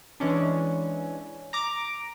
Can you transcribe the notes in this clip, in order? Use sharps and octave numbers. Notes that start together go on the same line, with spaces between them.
E3 G#3 C#4 D4
A#5 D6